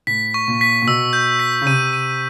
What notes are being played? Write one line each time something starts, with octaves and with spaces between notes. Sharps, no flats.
A2 B6
C#6
A#2
B6
A#2
B2 E6
G6
B6
C#3
C3 D#7
D#7